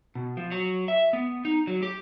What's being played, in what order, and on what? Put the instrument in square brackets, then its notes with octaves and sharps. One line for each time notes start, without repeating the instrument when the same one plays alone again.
[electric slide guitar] B2
F3
F#3
E5
B3
D#4
F#3
G4